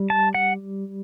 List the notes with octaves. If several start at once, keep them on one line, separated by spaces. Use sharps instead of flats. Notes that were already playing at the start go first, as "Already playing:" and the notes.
Already playing: G3
A5
F#5